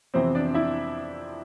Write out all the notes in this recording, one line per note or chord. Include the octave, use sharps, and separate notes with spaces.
F2 C3 E3 B3 C4 C5
D4 D5
E4 E5